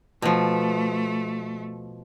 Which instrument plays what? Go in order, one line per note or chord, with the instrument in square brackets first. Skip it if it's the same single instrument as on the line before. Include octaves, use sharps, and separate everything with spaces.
[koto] B2 F3 [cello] A3